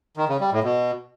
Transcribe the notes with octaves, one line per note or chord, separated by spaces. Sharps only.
D#3
C#3
G3
A2
B2